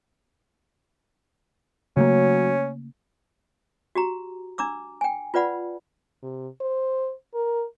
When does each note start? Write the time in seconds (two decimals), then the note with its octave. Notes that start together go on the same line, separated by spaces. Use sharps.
1.97 C#3 F#3 A3 A#3 C#4
3.95 F#4 G4 A#5
4.58 D4 A#5 D6 E6
5.01 G5 G#5
5.34 F4 B4 D5 F#5 B5
6.22 C3
6.61 C5
7.34 A#4